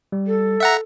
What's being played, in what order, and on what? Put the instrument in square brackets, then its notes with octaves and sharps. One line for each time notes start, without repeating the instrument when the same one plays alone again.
[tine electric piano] G3
[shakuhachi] A4
[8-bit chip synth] E5 F#5 A#5